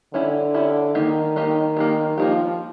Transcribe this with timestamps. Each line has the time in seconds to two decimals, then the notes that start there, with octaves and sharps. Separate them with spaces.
0.13 D3 C#4 E4 G4
0.54 C#4 E4 G4
0.95 D#3 A#3 D#4 G4
1.36 A#3 D#4 G4
1.77 A#3 D#4 G4
2.18 F3 A#3 D#4 G4